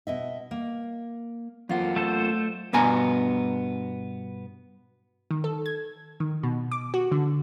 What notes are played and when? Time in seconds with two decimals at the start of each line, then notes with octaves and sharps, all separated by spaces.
0.07 B2 D#5 E5
0.51 A#3
1.69 F#2 A#3 F4 F#5
1.96 A3 A4 C5
2.73 G2 B2 B3 G#5 A#5
5.31 D#3
5.44 A4
5.66 G#6
6.20 D#3
6.43 B2
6.72 D6
6.94 F#4
7.12 D3